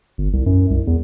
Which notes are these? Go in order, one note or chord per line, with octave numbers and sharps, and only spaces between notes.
G1
C2
F#2
C2
E2